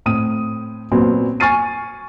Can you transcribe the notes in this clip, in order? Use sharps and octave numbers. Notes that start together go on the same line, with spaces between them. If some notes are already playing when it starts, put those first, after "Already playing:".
A2 C4 D#6 D#7
A#2 F#3 B3 C4 D4
G#5 C#6 F6 A6 C7 D#7